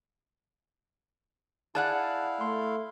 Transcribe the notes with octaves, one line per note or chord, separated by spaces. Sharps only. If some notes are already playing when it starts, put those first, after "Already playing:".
E4 G#4 D5 F5 F#5 A5 F#6
A3 C6